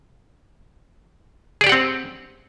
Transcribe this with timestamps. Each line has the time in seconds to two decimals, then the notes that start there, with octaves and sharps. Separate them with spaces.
1.61 G#4
1.64 D5
1.67 G4
1.69 F#5
1.72 C4